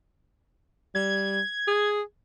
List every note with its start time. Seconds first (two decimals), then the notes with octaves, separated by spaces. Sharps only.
0.95 G3 G#6
1.68 G#4